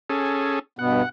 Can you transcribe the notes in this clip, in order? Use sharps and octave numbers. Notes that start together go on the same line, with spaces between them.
C#4 G#4 A4
G2 B2 B3 F#5